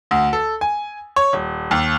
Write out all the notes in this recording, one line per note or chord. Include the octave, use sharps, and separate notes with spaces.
D2
A4
G#5
C#5
D#1
D#2